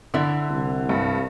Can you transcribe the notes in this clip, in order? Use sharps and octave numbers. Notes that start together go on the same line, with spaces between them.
D3 E4 D5 E5
C2
G2